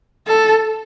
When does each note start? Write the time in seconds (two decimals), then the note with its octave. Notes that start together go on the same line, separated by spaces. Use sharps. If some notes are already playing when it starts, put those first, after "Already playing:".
0.27 A4